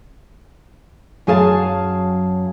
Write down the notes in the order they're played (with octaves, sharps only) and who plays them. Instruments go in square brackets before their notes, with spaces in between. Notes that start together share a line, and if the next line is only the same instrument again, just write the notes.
[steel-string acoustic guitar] F#2 F#3 G#4 F5 A5